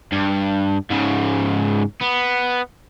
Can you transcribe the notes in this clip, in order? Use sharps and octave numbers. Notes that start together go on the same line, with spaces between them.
G2
G#2 C#3
B3